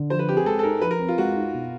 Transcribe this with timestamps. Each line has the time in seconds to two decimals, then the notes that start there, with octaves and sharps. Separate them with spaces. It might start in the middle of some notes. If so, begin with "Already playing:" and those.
Already playing: D3
0.10 F3 C5
0.19 B4
0.28 C4 G4
0.37 G#4
0.46 G#3 A4
0.59 A4
0.63 D#4 A#4
0.81 F3 B4
0.91 A#4
0.99 C4
1.09 F4
1.18 G#3 F#4
1.35 D#4
1.53 B2